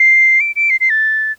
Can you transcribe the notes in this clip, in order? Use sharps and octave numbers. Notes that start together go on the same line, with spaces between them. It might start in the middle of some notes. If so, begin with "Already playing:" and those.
Already playing: C7
D7
D7
C7
C7
A6